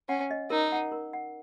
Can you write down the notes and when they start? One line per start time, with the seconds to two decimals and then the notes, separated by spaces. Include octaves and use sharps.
0.09 C#4 F#5
0.31 D#5
0.50 D#4 A#4
0.72 F#5
0.92 A#4
1.13 F#5